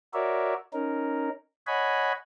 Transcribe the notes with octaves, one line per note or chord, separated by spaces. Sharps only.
F#4 A#4 C#5 D5 E5
C#4 D#4 A#4
C#5 D#5 F#5 G#5 B5